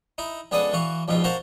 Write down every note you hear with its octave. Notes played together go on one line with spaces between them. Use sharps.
D#4 E4
C#2 B3 D4 G#4 A4 D#6
E3 F#4 F5
A#1 F2 G#2 B2 F4
F#4 A#4 C5 F5 A5